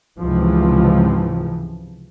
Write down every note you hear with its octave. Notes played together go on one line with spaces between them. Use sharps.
C#2 G#2 C3 E3 F3